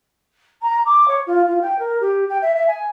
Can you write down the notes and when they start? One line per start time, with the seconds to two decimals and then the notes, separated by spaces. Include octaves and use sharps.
0.62 A#5
0.85 D6
1.08 C#5
1.27 F4
1.47 F4
1.61 G5
1.79 A#4
2.00 G4
2.29 G5
2.42 E5
2.55 E5
2.67 G#5